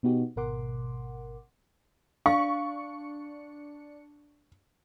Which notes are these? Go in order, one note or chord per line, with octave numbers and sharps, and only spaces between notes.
B2 B3 D#4 F#4 G4
G#1 B2 A#4 F#5 C6 D6
D4 F5 C#6 C#7